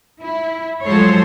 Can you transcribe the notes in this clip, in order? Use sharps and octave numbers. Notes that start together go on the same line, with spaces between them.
E4
F3 F#3 G#3 A4 C5 C#5